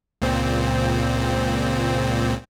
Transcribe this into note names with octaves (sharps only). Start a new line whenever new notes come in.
C#2 A#2 C4